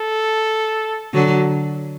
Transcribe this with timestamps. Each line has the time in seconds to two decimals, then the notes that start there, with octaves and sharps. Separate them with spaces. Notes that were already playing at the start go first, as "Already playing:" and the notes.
Already playing: A4
1.14 D3 F#3